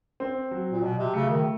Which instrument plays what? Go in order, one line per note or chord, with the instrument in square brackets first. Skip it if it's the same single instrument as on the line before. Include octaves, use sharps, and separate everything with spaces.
[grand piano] C4
F#3
[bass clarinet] A#2
[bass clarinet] B2 [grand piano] F#3
[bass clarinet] C3
[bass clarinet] C#3 [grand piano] A3
[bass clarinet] D#3